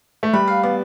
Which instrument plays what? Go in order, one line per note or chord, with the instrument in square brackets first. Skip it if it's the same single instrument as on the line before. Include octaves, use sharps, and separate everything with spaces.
[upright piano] A3
[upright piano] G3 [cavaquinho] B4
[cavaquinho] F5
[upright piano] B3 [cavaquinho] D5